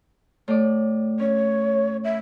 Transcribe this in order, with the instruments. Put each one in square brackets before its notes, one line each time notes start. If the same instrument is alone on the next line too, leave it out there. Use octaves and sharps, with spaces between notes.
[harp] A2 D5
[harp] C#4 [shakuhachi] C#5
[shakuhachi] E5